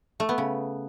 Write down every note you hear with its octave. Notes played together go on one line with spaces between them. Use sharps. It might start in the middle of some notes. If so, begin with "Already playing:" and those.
A3
B3
C#3